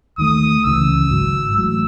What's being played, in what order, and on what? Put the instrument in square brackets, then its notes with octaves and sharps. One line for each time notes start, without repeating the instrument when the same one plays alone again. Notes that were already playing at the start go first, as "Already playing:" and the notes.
[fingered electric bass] D#2 D#3 A3 [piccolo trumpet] D#6
[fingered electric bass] C#2 C#3 E3 [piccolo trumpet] E6
[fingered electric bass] G#1 G#2 F#3
[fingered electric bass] A1 A2 F#3 [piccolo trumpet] E6